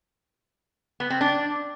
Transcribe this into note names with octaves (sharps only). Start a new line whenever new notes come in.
B3
C4
D4